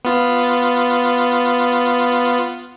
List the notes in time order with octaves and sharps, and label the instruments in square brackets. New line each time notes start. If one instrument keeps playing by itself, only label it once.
[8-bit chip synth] B3 F4